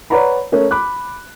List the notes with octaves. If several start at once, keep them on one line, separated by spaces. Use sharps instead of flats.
B4 C#5 D5 F#5 A#5 B5
A3 C#4 A#4
B5 D6 F#6